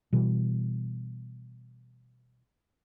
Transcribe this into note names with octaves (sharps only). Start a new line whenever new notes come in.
B2 E3 G3